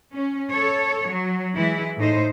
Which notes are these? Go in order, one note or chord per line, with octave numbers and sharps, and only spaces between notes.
C#4
A4 C#5
F#3
E3 G#3 E4
A2 D#4 C5